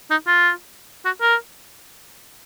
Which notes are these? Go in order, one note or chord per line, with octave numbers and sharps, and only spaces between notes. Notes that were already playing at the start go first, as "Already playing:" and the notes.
D#4
F4
F#4
A#4